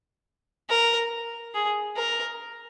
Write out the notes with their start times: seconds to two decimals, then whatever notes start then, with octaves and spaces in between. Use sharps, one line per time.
0.70 A#4
1.54 G#4
1.97 A#4